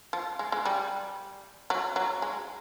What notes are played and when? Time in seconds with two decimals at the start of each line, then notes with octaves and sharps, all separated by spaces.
0.13 F3
0.39 G#3
0.52 G#3
0.65 G3
1.70 F#3
1.96 F#3
2.22 G#3